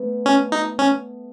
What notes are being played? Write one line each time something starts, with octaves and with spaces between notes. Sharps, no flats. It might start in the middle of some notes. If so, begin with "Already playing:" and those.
Already playing: A3 B3
C#4
D#4
C#4